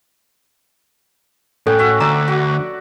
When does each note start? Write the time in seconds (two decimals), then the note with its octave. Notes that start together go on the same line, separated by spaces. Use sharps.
1.67 A2 C#4 A4 F#5 G5
1.79 F#4 C#5 E5
2.00 D2 D5 E5 A#5
2.28 F#4